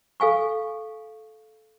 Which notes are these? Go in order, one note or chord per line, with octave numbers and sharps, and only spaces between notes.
A4 F5 G#5 C#6